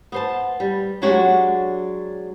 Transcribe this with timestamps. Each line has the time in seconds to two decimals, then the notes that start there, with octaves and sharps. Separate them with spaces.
0.12 B3 C5 A5
0.60 G3
1.02 F#3 G#3 D4 F#4 G4 C#5